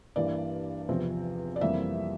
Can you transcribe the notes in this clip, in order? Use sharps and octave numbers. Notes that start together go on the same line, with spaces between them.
G2 E3 A#3 D5
E2 C3 F3 C4
D5
F2 C3 E3 G3 A#3 E5